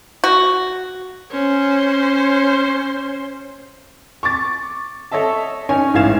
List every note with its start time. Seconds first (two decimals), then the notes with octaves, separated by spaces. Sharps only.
0.24 F#4
1.32 C#4 C5
4.23 C#6 D6 A6
5.12 A4 C#5 D#5 E5 A5
5.69 C#4 D#4 C#5 G#5
5.94 A1 G#2 E3 F5 G#6 E7